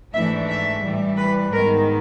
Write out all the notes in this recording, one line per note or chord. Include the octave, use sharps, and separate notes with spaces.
G#2 E3 A3 D4 E5
E5
A2 E3 G3
B4
G#2 D#3 G#3 B3 D#4 A#4